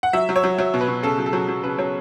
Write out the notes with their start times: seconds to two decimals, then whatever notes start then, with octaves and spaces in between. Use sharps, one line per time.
0.03 F#5
0.13 F#3 E5
0.29 F#3
0.36 C#5
0.44 F#3
0.58 F#3 C#5
0.74 B2
0.81 B4
0.88 B2
1.03 C#3 A4
1.18 F#3
1.26 A4
1.33 F#3
1.48 F#3
1.63 C#3 B4
1.78 F#3 C#5